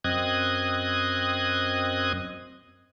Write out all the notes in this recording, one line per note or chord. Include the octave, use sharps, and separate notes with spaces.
F#2 C4 D#5 D#6 F#6 G#6